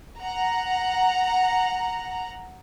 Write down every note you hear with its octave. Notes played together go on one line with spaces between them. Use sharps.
F#5 A#5